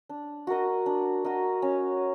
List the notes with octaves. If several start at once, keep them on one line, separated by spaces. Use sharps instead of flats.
D4
F#4 A#4 D#5
D4
F#4 A#4 D#5
C#4